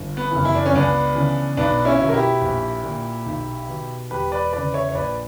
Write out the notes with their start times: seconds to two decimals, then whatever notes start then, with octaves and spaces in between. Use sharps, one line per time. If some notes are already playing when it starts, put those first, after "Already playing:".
Already playing: G1
0.17 B3
0.31 F#2 C#3 E3
0.45 E4
0.55 D4
0.66 C#4
0.73 C#2 B3 D4
1.15 C#3 E3
1.57 B1 B3 D4
1.85 C#4 E4
2.00 B2
2.08 A#4
2.14 E4 G4
2.42 A#1
2.84 A#2
3.26 B1
3.69 B2
4.11 E1 G4 B4
4.32 B4 D5
4.53 E2 C#3 B4 D5
4.74 C#5 E5
4.89 C#5
4.95 A#1 B4 D5